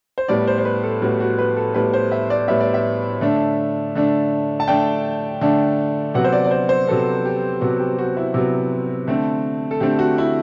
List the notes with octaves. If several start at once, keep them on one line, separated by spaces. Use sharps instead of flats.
C5
A2 G3 B3 D5
C5
C5
B4
A4
A2 G3 B3 F#4
F#4
B4
A4
A2 G3 B3 B4
C5
E5
D5
A2 G3 B3 E5
D5
E5
D3 A3 D4
D3 A3 D4
A5
D3 A3 D4 G5
D3 A3 D4
C3 F#3 B3 F#5
C5
D5
D5
C5
C5
C3 F#3 B3 A4
G4
C3 F#3 B3 F#4
G4
F#4
E4
C3 F#3 B3
D3 A3 C4
A4
D3 A3 C4 G4
F#4
E4